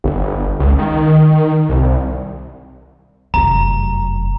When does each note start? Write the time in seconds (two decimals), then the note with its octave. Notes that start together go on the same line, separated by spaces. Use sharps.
0.04 G1
0.60 C#2
0.78 D#3
1.69 C2
3.34 F1 F#2 A#5